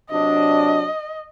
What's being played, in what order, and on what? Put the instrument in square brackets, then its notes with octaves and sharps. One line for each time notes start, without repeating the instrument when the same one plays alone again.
[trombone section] C3 F#3 D4 [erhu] D#5